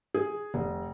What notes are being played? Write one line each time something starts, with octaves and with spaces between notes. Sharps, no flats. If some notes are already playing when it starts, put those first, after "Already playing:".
G#4
F1